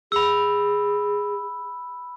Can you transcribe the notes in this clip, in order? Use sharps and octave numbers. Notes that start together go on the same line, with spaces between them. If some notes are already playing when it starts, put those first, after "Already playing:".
G#4 B5 E6